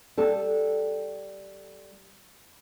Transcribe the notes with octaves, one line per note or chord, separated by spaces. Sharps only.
G3 A4